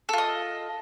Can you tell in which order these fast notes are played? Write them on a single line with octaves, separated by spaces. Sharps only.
A4 F4 D#5